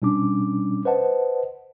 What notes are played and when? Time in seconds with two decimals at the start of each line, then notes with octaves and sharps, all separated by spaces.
0.02 B2 G3 C#4 D4 D6
0.85 B4 C5 D#5 F#5 A5